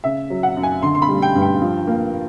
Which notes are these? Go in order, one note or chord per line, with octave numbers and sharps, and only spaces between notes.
C#3 E5
F#3
F#5
F#2
G#5
D3 C6
C6
B5
G3
G5
G2
G5
F3
A#3